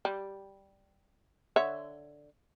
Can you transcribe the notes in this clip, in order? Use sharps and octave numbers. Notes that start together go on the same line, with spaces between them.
G3
D3 C#5 E5